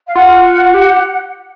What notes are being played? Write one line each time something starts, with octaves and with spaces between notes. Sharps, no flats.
F5
F4 F#5
G4